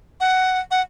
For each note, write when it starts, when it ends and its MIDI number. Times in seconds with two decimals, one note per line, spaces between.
0.20 0.60 78
0.71 0.81 78